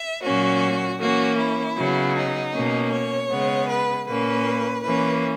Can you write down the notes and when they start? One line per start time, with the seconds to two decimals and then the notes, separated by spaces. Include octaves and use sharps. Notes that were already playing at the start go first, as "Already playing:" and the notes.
Already playing: E5
0.23 A#2 F#3 A#3 C#4 F#4
0.99 E3 A#3 C#4 F#4
1.38 E4
1.76 C#3 F#3 B3
2.15 D#4
2.53 B2 A#3 C#4
2.92 C#5
3.30 C#3 G#3 B3
3.68 B4
4.07 A#2 A#3 C#4 B4
4.83 E3 A#3 C#4 B4